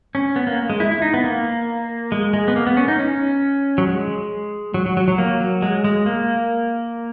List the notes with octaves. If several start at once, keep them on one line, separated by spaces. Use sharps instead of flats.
C#4
B3
A#3
G#3
E4
E4
D#4
B3
A#3
G#3
G#3
B3
A#3
B3
C#4
D#4
C#4
F#3
G#3
F#3
F#3
F#3
F#3
A#3
F#3
G#3
G#3
A#3